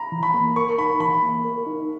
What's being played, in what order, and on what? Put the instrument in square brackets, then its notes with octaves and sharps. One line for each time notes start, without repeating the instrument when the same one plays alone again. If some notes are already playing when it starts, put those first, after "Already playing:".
Already playing: [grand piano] A#5 B5
[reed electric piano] E3
[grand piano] B5
[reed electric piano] A#3
[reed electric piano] A#4 [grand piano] C#6
[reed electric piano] D#4 [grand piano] B5
[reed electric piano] E3 [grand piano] B5
[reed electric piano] A#3
A#4
D#4